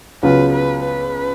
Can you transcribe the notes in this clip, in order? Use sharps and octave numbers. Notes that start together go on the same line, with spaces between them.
C#2 C#3 F#3 B3 F4 B4
B4
B4